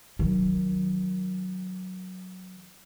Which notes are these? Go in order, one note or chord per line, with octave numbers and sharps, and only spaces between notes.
D#3 F#3